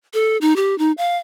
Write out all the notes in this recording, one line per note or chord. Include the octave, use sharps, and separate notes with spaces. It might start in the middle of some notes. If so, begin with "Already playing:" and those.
A4
D#4
G4
D#4
F5